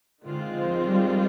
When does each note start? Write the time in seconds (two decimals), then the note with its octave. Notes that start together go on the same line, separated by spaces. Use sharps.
0.24 D3 D#3 G#3 C4 F4
0.55 F3
0.87 G3